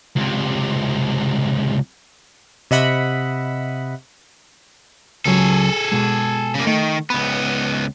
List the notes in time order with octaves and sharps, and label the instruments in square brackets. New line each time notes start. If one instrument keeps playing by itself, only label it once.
[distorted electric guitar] C#2 C3
[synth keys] C3 D#5 E5 F#5 B5
[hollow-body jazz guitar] C#2 F#3 [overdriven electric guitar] G#4 A4
[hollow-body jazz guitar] B2 G#3
[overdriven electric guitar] C#3 A#3
[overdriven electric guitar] D#3 [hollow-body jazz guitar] A3
[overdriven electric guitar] C#2 B3 [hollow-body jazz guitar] B5